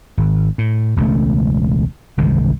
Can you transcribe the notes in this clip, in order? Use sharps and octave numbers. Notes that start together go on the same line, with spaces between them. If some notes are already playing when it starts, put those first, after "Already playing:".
G#1
A2
E1 C#2 C#3 A3
G1 C2 D#3 G#3